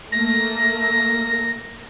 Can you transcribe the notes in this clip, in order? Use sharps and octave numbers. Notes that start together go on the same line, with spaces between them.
A3 A#3 A#6